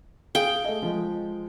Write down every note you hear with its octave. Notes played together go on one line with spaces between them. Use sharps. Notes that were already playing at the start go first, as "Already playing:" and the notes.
G#4 F5 G5
A3 D#5
F3 G#3